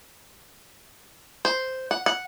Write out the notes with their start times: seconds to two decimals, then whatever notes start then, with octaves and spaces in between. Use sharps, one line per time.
1.45 C5
1.91 F#5
2.06 F#5